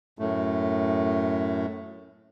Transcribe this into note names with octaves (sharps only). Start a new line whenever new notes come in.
F#2 A2 A3